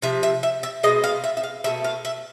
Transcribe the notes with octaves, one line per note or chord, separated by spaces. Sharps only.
C3 F3 E5
E5
E5
E5
B2 G#3 D#5
F5
E5
E5
F5
B2 F#3 A3 E5
F5
E5